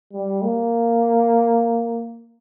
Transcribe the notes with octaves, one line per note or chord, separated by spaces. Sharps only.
G3
A#3